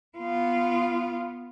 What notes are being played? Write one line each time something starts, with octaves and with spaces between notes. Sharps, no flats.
B3 F4